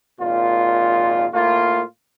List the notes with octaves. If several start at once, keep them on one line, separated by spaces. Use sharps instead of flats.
G#1 A#2 F4
A2 A#3 F4